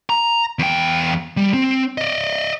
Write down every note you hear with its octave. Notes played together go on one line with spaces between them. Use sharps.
A#5
E2 G5
G3
C4
D5 D#5